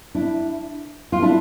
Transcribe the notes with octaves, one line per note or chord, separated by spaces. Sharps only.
D4 E4
F4
D4 E4